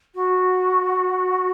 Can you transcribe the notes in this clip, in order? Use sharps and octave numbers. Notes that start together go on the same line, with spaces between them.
F#4